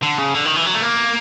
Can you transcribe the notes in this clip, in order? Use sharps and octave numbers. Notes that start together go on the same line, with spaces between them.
D3
C#3
D3
D#3
E3
F#3
A3
A#3